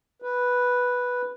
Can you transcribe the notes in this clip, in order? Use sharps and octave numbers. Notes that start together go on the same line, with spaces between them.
B4